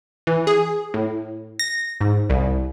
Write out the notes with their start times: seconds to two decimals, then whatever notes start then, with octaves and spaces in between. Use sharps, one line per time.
0.27 E3
0.47 G#4
0.94 A2
1.59 A#6
2.01 G#2
2.30 C2